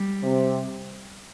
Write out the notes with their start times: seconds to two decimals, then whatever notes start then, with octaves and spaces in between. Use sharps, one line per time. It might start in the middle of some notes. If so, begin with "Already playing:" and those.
Already playing: G3
0.22 C3